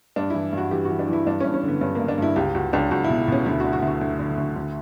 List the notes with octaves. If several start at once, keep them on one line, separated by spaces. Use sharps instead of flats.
G2 D4
E3 E4
G2 F#4
E3 G4
E3 F#4
D4
E3
E4
G2 D4
G2 C#4
C#4
D3 B3
G2 C#4
G2 A#3
D4
G2 E4
C#2 G4
C#2 F#4
C#2 D4
C#2 F#4
E4
B2
B2 C#4
D2 E4
F#4
D3
F#4
D2
F#4
D2
D3
D2
D2